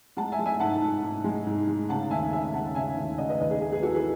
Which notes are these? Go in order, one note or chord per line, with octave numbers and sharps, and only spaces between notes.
G#3 F#5 A5
E5 G#5
G#3
E5 G#5
G#2 F#5 A5
G#2
G#2
G#3
G#2
G#3
C#3 F#5 A5
D#2 E5 G#5
G#3 E5 G#5
C#3 F#5 A5
C#3 E5 G#5
D#2
C#3 D#5 F#5
B4 D#5
D#2 B4 D#5
G#4
A3 G#4
G#4 B4
E3 F#4 A4
G#4 B4